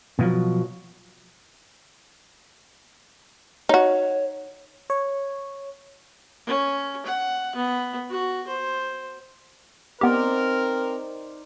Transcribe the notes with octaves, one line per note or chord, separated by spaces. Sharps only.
B2 F3 F#3
D#4 F#4 C#5
C#5
C#4
F#5
B3
F#4
C5
B3 C4 D#4 G4 A#4 C5 D5